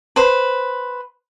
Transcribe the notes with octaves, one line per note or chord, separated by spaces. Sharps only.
B4 C5